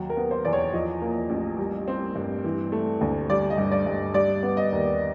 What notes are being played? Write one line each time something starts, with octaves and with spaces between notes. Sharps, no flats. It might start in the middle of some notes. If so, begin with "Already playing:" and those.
Already playing: D#2 F#3
A#4
B3
C5
E2 D5
C#5
F3 D#5
A#3
A1
G3
C4
G2
E3
A3
D2
G3 D5
D#5
G2
D5
G2
G3 D5
B3
D#5
D#2